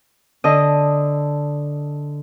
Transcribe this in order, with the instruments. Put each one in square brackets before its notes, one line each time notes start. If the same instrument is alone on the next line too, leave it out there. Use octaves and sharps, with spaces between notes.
[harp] D3 D#5 D#6